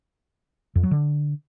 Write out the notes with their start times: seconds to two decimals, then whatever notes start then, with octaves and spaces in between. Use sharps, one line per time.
0.76 F2
0.83 F#3
0.91 D3